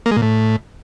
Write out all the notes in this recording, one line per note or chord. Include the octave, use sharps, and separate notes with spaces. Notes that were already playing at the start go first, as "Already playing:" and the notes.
A#3
G#3
A#2
A2